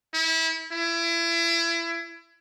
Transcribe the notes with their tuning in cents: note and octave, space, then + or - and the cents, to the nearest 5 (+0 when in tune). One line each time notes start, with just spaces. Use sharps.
E4 -25
E4 +30